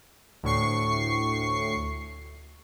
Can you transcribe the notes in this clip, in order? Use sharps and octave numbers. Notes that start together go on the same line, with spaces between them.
D2 A2 C#6 C7